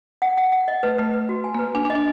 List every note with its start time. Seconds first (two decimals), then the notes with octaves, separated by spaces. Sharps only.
0.22 F#5
0.37 F#5
0.52 F#5
0.68 D#5
0.83 A3 B4
0.98 A3 B4
1.14 B4
1.29 F#4
1.44 G#5
1.55 A#3
1.59 B4
1.75 D4 G#5
1.85 D4
1.90 D#5
1.95 D4